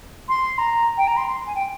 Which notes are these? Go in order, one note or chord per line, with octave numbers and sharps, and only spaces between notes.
C6
A#5
G5
A#5
C6
C6
G#5
G5